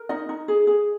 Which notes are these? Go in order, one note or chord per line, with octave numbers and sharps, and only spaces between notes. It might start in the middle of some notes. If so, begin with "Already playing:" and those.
Already playing: A#4
D#4 D#5
D#4
G#4
G#4